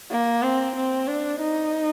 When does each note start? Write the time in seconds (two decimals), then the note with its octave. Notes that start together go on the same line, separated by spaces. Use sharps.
0.11 A#3
0.43 C4
0.76 C4
1.08 D4
1.41 D#4